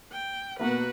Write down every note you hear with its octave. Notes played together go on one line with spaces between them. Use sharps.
G5
B2 A#3 B3 F#4 B4